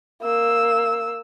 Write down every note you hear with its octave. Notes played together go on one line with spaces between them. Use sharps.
A#3 E6